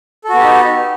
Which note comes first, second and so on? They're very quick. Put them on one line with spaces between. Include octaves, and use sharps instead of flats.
A4 F#4 B3 G4 D#4